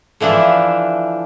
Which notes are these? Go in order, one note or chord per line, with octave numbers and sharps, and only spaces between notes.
D3 E3 F3 D4 E4